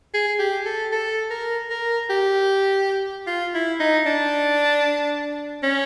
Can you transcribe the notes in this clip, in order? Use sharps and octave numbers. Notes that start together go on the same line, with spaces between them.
G#4
G4
A4
A4
A#4
A#4
G4
F4
E4
D#4
D4
C#4